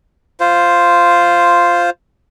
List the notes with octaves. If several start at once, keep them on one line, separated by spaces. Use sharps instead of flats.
F4 C5